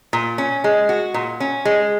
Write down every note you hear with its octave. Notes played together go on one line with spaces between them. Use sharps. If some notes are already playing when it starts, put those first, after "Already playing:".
A#2
C#4
G#3
F#4
A#2
C#4
G#3